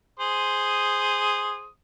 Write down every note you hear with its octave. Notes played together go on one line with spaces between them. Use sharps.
G#4 C5 D#6